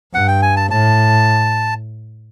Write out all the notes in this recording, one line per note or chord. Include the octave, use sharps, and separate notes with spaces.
G2 F#5
G5
G#5
A5
A2 A5